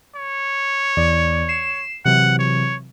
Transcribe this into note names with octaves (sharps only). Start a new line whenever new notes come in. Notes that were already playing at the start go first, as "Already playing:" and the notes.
C#5
E2 E3 D5
C7 E7
C3 E3 F#3 F#5
C#5